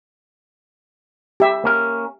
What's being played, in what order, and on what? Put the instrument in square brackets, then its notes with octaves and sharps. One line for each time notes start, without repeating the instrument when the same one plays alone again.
[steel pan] G4 E5
[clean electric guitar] A#3 C#4 A#4